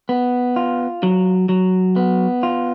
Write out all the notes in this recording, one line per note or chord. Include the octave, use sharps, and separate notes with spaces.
B3
F4
F#3
F#3
B3
F4